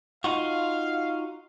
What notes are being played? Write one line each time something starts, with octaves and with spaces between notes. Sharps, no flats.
D#4 F4 F#4 F5